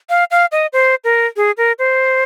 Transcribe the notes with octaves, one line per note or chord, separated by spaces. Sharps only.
F5
F5
D#5
C5
A#4
G#4
A#4
C5